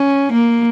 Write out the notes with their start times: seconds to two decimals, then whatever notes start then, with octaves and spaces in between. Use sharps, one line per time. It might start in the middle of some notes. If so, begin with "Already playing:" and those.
Already playing: C#4
0.32 A#3